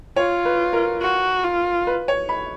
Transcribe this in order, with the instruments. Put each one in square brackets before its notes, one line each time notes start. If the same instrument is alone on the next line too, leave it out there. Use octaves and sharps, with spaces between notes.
[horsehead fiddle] F4 [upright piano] C#5
[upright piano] B4
A#4
[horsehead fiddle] F#4
F4
[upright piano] B4
C#5
B5